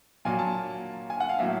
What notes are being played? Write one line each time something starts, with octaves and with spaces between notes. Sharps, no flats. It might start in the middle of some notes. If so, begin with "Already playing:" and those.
A#2 F#3 A#3 G#5
A5
G#5
F#5
F5
A2 F#3 A#3 E5